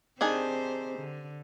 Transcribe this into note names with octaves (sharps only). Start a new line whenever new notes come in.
D#3 C4 D4 G4 G#4 C5
D3